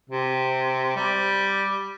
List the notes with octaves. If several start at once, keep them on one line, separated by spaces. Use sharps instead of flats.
C3
G3